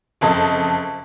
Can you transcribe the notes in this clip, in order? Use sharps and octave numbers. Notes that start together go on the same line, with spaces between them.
F#1 F2 A4 D#5